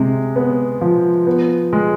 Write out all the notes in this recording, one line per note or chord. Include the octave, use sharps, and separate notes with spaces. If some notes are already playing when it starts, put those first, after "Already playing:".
Already playing: C3 G#3
B3
F3
B3
G#3